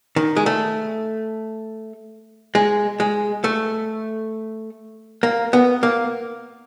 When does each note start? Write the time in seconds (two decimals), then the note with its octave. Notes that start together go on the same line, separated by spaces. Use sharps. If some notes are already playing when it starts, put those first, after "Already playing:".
0.16 D#3
0.36 G#3
0.46 A3
2.55 G#3
3.00 G#3
3.44 A3
5.23 A#3
5.53 B3
5.83 A#3